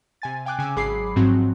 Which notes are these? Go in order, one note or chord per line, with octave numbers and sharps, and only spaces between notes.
C3 G#5 A6
F5 G5 G#5 D6 F#6
C#3 G#5 D6 E6
G#1 F#3 G#4 B5 D6 C7
G#2 F3 F#3 C4 F#4